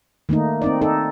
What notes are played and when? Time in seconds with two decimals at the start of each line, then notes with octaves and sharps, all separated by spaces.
0.29 D#3 A3 A#3 D#4
0.62 C4 D#4 D5
0.82 D#4 A4